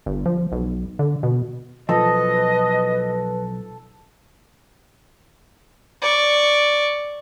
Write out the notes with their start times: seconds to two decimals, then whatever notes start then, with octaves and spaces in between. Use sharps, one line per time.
0.06 G1
0.26 F3
0.52 B1
0.99 D3
1.23 B2
1.89 B1 F3 A4 B4 D#5
6.02 D5 C#6